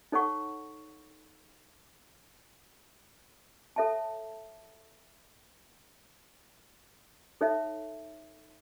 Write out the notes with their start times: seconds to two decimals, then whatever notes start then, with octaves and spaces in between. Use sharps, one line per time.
0.12 D#4 A4 C#5 F#5 C#6
3.76 A4 C#5 E5 A5
7.41 D#4 A4 C#5 E5